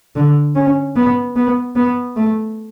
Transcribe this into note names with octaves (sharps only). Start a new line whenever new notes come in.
D3
C#4
B3
B3
B3
A3